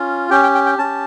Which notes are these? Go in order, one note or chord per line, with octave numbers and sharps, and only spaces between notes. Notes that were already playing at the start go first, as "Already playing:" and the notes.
Already playing: C#4 F4
C#4 G4 G5
G5
G5
G5
C#4 A5
G4